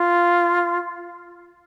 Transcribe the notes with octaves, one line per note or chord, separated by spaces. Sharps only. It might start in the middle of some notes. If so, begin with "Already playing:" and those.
Already playing: F4